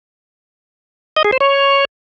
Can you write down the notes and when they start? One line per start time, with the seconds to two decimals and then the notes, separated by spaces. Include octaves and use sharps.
1.17 D#5
1.25 G#4
1.32 C5
1.40 C#5